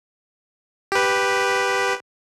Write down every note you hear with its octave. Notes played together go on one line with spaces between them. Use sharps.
G4 B4